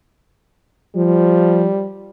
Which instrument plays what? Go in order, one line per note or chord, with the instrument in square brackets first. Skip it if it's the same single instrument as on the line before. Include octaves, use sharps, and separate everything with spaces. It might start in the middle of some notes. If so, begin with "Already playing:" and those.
[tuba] F3 [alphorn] G3